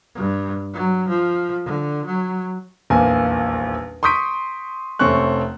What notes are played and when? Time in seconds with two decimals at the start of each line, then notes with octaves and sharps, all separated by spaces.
0.16 G2
0.73 F#3
1.09 F3
1.65 D3
2.05 F#3
2.90 D#1 A#1 E2 A#3 G#5
4.03 C6 C#6 D#6 G6 B6 D7
4.99 F1 A3 C4 C#4 C#6 F#6